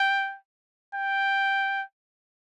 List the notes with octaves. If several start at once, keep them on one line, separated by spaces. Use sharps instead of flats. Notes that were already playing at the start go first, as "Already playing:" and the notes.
Already playing: G5
G5